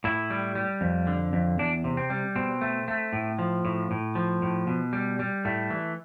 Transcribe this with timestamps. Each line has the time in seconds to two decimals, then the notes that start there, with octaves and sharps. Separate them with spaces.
0.04 A2 E4
0.30 G3
0.55 G3
0.81 F2
1.07 D3
1.33 F2
1.59 E2 D4
1.84 C3
1.97 C4
2.10 G3
2.36 B2 C4
2.61 A3
2.88 A3
3.13 A2
3.39 F3
3.65 A2
3.91 A2
4.15 F3
4.42 A2
4.67 B2
4.93 G3
5.19 G3
5.45 A2 A3
5.70 E3